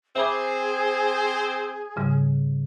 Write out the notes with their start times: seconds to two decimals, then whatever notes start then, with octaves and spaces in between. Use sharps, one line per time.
0.16 C4 G#4 C5 E5 B5 D6
1.96 G#2 C#3 G3